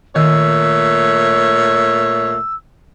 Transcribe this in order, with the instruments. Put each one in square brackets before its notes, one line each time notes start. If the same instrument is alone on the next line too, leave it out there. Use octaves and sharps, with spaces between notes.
[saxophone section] A#2 A3 C#5 [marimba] D#3 [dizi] E6